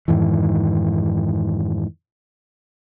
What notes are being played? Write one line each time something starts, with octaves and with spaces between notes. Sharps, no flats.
F2 G#2 D#3 E3